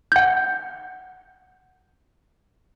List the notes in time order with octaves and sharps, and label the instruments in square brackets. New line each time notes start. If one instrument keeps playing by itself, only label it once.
[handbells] F#5 G6